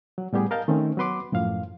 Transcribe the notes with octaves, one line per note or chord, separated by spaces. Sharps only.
F#3
A2 G3 B3 G4 G#4
A#4 D#5 F5 A5 G6
D#3 A3 C4 C#4
F#3 B3 B4 C6 D6
F#2 A2 F3 F5